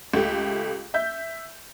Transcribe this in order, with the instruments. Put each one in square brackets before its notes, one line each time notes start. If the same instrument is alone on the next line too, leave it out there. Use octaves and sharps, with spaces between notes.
[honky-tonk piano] C#2 A3 G4
E5 G6